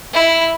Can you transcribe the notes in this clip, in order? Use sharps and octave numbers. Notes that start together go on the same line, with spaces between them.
E4